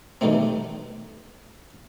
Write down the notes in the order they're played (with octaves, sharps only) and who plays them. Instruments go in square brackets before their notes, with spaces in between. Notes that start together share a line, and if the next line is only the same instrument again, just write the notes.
[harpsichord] G2 B2 D#3 F#3 A3 C4